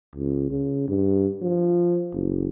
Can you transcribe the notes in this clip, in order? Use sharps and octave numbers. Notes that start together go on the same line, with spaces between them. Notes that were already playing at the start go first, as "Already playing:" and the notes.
C#2
C#3
G2
F3
F#1